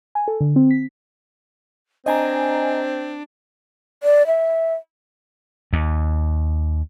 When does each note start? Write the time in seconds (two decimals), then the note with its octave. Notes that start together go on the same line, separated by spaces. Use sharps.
0.15 G#5
0.28 A4
0.41 D3
0.56 C4
0.71 B6
2.06 C4 D4 D#5 G#5 A#5
4.03 D5
4.27 E5
5.73 D#2